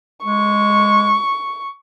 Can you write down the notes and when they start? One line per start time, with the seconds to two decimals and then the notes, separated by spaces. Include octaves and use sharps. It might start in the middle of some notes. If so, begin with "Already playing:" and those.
0.24 G#3 C#6